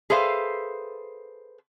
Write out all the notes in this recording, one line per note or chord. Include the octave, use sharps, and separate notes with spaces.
G#4 A4 B4 C5 E5 F5